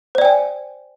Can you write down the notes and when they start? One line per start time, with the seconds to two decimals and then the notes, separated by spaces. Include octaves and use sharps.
0.15 C5
0.18 D5
0.22 G5
0.25 G#5